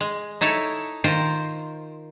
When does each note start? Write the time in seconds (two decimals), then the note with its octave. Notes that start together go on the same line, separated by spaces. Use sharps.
0.01 G#3
0.41 D#4 E4 A4 C#5
1.04 D#3 F4 A#4 C5